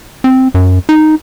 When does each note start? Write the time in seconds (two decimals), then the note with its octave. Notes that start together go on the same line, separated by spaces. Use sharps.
0.24 C4
0.54 F#2
0.89 D#4